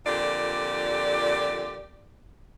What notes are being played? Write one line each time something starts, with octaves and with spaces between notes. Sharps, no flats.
F2 A#2 D3 G4 D5